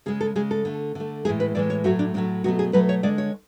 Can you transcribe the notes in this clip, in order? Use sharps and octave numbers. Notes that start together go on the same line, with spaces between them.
C#3 G#3 G#4
A4
C#3 G#3 G#4
A4
D3 A3
D3 A3
A2 E3 G#3 G#4
B4
A2 E3 G#3 D5
C#5
A2 F#3 A3 F#4
D4
A2 F#3 A3 D4
B2 F#3 A3 F#4
G#4
B2 F#3 A3 B4
C#5
D3 G#3 D5
C#5